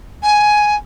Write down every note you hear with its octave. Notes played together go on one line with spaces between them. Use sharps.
G#5